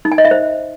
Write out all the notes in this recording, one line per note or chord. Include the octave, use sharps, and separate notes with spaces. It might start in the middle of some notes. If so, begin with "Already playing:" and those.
D#4
G#5
D#5
E5
C5